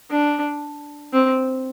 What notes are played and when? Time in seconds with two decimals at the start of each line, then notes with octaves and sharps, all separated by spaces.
0.11 D4
1.13 C4